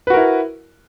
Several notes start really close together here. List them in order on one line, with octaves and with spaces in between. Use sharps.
B4 F#4 A#4 E4